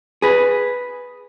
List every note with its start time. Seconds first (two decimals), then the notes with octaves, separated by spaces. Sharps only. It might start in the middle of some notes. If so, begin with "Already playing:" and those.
0.22 G#4 B4